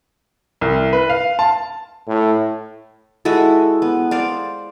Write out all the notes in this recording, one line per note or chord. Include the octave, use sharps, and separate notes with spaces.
C2
B4
F5
A5
A2
G#3 E4 F#4 A4
B3
C5 D5 F5